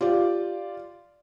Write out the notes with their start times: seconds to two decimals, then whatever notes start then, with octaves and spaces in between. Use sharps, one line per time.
0.01 F4 G4 D5